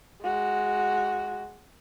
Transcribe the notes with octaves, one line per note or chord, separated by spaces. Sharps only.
G#3 F#4